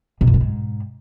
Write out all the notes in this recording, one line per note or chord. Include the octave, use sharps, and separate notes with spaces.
B2
F#2
B2
G#2